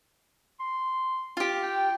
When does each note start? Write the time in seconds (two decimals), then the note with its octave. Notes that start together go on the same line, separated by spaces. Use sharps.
0.59 C6
1.37 F4 G4
1.62 G5